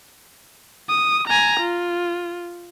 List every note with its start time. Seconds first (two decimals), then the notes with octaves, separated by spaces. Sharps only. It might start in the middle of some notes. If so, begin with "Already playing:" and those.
0.89 D#6
1.28 G#5 A#5
1.60 F4